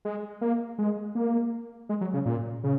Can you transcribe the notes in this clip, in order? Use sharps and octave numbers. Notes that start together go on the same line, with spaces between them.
G#3
A#3
G#3
A#3
G#3
F#3
C#3
A#2
C#3